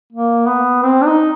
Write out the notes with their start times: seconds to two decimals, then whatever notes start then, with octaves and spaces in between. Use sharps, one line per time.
0.13 A#3
0.47 B3
0.83 C4
1.02 D4
1.06 D#4